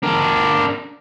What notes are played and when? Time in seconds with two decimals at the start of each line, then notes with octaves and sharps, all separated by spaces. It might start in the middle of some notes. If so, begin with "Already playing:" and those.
0.03 D4 A#4